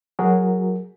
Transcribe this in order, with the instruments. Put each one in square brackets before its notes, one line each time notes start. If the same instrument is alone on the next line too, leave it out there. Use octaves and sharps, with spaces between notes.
[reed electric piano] F#3 F#4 G#4 A#4